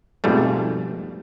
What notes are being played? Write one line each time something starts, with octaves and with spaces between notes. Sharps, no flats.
F2 G#2 B2 G3 A3